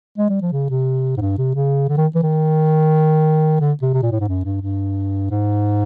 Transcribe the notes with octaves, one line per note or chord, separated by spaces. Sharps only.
G#3
G3
F3
C#3
C3
G#2
G2
C3
C#3
D3
D#3
E3
D#3
D3
C3
C3
A#2
A2
G#2
F#2
G2
G2
G#2